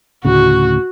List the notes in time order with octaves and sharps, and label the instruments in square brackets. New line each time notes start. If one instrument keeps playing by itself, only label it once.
[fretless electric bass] D2 A2 C#3 [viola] F#4